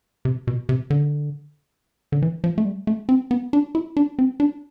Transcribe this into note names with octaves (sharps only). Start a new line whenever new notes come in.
C3
B2
C3
D3
D3
E3
F3
A3
G3
A3
C4
B3
D4
E4
D4
C4
D4